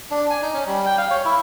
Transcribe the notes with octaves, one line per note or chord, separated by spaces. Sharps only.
D4
G#5
D#4
C#4
G3
G5
F5
C#5
E4